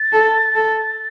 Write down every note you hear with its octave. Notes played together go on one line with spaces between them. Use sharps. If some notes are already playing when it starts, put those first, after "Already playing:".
Already playing: A6
A4
A4